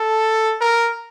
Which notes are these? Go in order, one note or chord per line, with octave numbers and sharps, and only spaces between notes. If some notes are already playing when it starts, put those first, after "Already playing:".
Already playing: A4
A#4